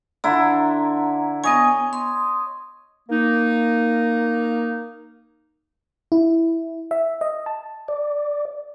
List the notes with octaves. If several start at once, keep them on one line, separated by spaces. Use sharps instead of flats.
D3 E4 A#5 C6
B3 C#5 D#5 G#5
C6
A#3 D#4
E4
E5
D#5
A5
D5